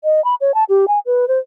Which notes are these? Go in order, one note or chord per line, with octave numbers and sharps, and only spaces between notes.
D#5
B5
C#5
A5
G4
G#5
B4
C5